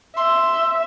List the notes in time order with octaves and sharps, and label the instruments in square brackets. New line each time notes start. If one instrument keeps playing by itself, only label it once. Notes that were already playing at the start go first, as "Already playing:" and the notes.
[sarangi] E5 [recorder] C6